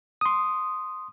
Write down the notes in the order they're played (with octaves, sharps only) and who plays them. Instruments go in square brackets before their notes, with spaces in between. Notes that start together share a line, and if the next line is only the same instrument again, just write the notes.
[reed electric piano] C6 D#6